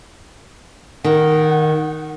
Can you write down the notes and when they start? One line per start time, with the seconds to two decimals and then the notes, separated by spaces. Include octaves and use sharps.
1.04 D#3 F#5